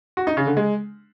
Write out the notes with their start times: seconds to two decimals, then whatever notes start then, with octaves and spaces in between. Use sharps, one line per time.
0.17 F#4
0.27 D#4
0.37 C#3
0.47 D3
0.57 G#3